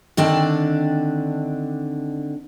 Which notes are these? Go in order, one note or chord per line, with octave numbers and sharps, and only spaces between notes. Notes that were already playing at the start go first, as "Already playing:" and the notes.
D3 D#3 C4 D4 D5 A5